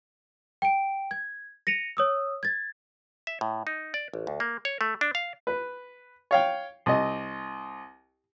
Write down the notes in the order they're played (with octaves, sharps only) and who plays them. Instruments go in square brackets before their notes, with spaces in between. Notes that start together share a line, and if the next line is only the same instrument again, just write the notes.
[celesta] G5 D7
G#6
A#6 C#7 D#7 F7
C#5 D#6 E6
G#6 A6
[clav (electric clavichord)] E5
A2
D#4
D5
A1
D2
A#3
C#5
A3
D4
F5
[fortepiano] B4
C#5 F5 G5
C2 D#5